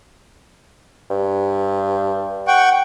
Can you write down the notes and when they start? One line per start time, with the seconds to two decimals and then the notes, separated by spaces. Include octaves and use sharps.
1.10 G2
2.48 F#5 G5 C#6